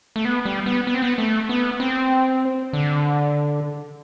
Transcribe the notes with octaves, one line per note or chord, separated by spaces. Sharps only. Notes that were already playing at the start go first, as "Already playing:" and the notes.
A3
B3
G3
B3
B3
C4
B3
A3
B3
C4
D3